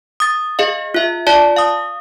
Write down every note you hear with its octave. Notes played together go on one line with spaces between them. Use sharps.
D#6 A6
G#4 D#5 F5
F4 E5
F4 D5 A5
F5 D#6